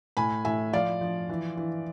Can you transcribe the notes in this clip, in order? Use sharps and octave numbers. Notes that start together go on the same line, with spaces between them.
A2 G#5 B5
A2 E5 G#5
F3 D5 F5
F3
E3
E3